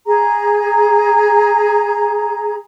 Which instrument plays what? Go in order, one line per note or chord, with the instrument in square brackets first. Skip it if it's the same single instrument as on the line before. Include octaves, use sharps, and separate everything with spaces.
[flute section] G#4 A#5